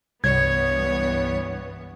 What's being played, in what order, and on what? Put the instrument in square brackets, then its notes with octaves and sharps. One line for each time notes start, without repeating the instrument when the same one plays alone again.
[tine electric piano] C2 [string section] G2 E3 B3 [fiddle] C#5 [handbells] G#6